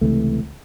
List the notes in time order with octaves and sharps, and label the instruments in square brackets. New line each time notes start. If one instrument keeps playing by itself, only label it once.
[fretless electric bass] C#2 C3 E3 A3